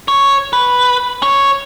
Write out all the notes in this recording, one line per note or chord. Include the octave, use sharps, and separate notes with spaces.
C#5
B4
C#5